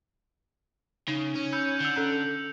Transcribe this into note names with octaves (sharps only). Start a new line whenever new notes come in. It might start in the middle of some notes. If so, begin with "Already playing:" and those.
C#3 D#4
C#4
B5 E6 G6 C#7
D3 E6 F7
C#4 A4